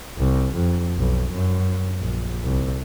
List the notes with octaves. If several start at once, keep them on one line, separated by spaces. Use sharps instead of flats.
C2
F2
B1
F#2
A#1
C2